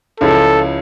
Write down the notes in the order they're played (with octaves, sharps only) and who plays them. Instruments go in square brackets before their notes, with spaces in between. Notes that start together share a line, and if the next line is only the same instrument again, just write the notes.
[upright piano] C#2 C#3 F3 C#4 E4 [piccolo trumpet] A4